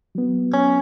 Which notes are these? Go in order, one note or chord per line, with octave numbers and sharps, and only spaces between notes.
F#3 B3
C#4